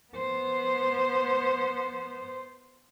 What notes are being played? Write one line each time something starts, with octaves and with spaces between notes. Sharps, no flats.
B3 C5